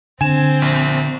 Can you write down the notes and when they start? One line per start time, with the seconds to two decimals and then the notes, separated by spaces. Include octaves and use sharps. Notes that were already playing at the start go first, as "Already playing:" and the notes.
0.21 D3 C4 G#5 E7
0.62 A#1